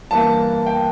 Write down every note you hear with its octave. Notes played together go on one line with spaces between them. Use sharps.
G2 E3 A#3 A5
G5